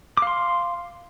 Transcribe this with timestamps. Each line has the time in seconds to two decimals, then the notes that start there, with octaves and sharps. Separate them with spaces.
0.17 D6
0.22 F5
0.27 C6